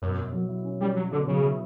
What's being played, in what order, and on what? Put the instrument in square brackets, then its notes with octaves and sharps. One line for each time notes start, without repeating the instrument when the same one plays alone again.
[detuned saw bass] F#2 [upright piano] B2
[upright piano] B2
F#3
E4
C#4
[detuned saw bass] G3 [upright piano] C#4
[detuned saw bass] F#3 [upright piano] C#4
[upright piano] B2 [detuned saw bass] D3
[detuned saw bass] C#3 [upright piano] F#3
[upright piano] E4